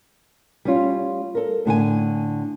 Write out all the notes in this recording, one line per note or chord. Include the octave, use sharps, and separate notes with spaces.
G3 C#4 F4
A4 A#4
A2 D3 F#5 G#5